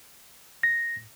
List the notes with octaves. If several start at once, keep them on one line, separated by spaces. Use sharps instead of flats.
A#6